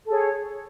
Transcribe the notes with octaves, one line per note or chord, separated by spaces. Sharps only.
G#4 A4 C#5